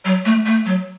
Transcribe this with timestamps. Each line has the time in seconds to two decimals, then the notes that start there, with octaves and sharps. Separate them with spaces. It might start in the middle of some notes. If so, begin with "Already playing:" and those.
0.05 F#3
0.25 A3
0.46 A3
0.66 F#3